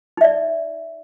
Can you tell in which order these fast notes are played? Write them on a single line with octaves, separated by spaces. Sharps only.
D#4 E5 D5